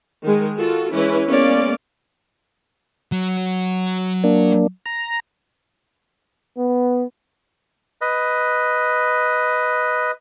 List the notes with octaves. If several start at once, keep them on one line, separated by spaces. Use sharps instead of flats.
D#3 G#3
F4 F#4 A4
E3 G#3 C#4 E4 B4
G#3 A#3 B3 C#4 D5 F5
F#3
A#3 D4
A#5
B3
B4 D#5